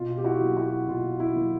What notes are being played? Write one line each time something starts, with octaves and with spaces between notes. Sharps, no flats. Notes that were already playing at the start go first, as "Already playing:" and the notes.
Already playing: B2 F4
G4
E4 F#4
F#3 A#3
E4 F#4
B2 F4
E4
F#3 A#3